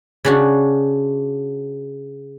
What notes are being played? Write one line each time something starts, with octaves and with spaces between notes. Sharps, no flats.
C#3 D4 F#4